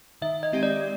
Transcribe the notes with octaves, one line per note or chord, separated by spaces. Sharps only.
D#3 E5
D#5
G#3 C4 D#4 G4
D5